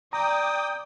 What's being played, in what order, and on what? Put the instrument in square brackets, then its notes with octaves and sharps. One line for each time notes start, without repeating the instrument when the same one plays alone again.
[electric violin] D5 [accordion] G5 D#6 [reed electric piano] A#5